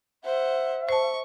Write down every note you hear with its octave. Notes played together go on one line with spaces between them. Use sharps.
C5 E5 F#5
C5 A5 C#6